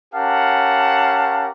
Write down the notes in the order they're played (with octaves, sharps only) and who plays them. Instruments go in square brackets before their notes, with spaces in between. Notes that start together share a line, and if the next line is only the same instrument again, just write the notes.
[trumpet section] C#4 G4 A#4 F5 F#5 A5